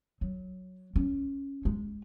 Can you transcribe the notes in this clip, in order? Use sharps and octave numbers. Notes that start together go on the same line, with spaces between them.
F#3
C#4
G#3